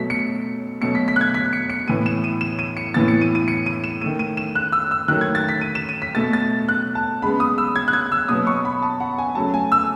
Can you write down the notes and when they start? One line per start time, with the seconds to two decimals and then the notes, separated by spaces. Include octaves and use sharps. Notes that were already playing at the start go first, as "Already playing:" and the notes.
Already playing: B2 F#3 A3 B6
0.10 C#7
0.81 B2 F#3 A3 C#7
0.95 B6
1.08 B6
1.16 F#6
1.21 G#6
1.34 B6
1.53 C#7
1.70 C#7
1.87 A2 E3 B3 D#7
2.06 E7
2.24 D#7
2.41 E7
2.59 D#7
2.77 C#7
2.94 A2 E3 B3 A6
3.08 C#7
3.21 D#7
3.35 D#7
3.48 C#7
3.66 D#7
3.84 E7
4.01 D#3 A3 D#7
4.19 D#7
4.37 E7
4.55 F#6
4.72 E6
4.91 E6
5.08 D#3 F#3 A3 F#6
5.21 G#6
5.35 A6
5.49 B6
5.61 D#7
5.75 E7
5.89 D#7
6.02 B6
6.15 B2 A3 A6
6.33 A6
6.68 F#6
6.95 A5
7.22 C#3 G#3 B3 B5
7.40 D#6
7.58 E6
7.76 G#6
7.88 F#6
7.93 G#6
8.12 E6
8.28 B2 F#3 B3 D#6
8.47 C#6
8.65 B5
8.82 A5
9.00 F#5
9.18 G#5
9.35 C#3 F#3 A3 A5
9.54 G#5
9.72 E6